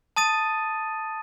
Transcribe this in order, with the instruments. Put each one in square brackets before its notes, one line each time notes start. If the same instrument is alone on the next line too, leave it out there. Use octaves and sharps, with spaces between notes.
[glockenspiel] A5 D#6 A6 D#7